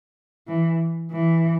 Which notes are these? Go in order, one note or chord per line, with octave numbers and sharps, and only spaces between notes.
E3
E3